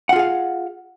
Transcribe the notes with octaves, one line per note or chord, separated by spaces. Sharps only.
F4 G#4 F5 F#5